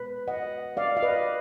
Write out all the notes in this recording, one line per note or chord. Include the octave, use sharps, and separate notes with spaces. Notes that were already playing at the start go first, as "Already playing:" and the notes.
Already playing: A#2 G#3 B3 B4
D#5 F#5
D5 F5
F5
B4 D#5